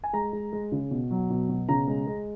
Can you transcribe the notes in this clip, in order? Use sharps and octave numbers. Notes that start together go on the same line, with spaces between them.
G#5
G#3 A#5
G#3
G#3
C#3
B2
F#3
B2
B2
C#3 A#5
G#3
G#3